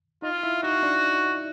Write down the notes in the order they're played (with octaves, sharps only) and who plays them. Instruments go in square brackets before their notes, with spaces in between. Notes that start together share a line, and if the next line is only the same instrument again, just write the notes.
[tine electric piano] D#4 D#5 [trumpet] F4
[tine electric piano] E4 E5
[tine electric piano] D#4 D#5 [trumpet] F#4
[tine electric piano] D4 D5